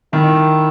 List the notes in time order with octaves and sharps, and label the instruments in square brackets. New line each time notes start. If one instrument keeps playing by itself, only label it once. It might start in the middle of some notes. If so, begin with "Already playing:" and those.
[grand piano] D#3 [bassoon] E4